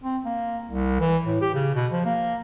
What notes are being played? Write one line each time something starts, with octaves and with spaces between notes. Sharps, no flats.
C4
A#3
C2
E3
A2
G4
C#3
B2
F3
A#3